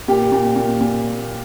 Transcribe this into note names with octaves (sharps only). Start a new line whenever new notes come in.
A#2 G4
A#2
A#2
A#2